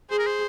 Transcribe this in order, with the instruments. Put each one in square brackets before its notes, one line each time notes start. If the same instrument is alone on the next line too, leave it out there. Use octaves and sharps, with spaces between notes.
[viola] G#4 [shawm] C5
[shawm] A#4
C5